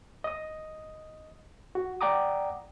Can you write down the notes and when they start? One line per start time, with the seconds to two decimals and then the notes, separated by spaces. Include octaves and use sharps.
0.24 D#5 D#6
1.75 F#4
2.01 D5 F#5 G5 A#5 D6 D#6